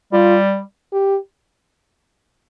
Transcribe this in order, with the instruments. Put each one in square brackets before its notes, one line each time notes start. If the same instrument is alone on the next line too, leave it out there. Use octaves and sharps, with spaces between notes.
[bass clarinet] G3 [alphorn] F4
[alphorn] G4